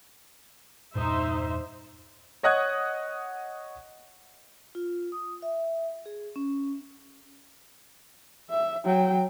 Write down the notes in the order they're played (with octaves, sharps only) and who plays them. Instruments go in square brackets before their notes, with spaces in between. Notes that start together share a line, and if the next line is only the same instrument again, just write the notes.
[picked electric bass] E2 G2 A#2 [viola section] D#4 C5 E5
[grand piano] C#5 D#5 F#5 D#6 F#6 G#6
[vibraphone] F4
D#6
E5
G#4
C#4
[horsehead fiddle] E5
F#3 G5